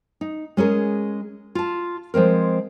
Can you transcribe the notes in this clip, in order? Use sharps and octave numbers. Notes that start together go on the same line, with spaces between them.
D#4
G#3 C#4 G#4 A#4
F4 A5
F3 G#3 C4 A#4